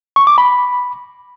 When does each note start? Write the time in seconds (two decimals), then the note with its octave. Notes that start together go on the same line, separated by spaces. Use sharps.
0.16 C#6
0.27 D6
0.38 B5